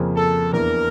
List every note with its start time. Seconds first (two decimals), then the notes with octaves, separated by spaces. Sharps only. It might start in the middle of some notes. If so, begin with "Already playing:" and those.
Already playing: F2 C#3 F3 A#3
0.16 A4
0.53 E2 E3 A#3 D4 A#4